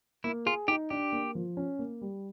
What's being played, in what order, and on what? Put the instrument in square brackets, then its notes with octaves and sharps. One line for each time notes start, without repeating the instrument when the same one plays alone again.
[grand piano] A#3 [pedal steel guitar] E4
[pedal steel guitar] F4 [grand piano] G#4
[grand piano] D#4 [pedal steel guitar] G4
[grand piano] D4 [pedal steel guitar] G4
[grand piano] A#3
F3
C#4
A#3
G3